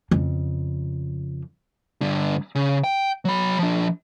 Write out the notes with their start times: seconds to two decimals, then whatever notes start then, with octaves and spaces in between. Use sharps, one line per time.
0.11 F2 C#3
2.01 G2 D3
2.55 C#3
2.84 G5
3.25 F#3 B5
3.59 F3 D4